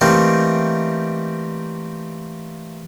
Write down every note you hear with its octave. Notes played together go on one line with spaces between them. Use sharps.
E3 G3 A3 A#3 C4 D#4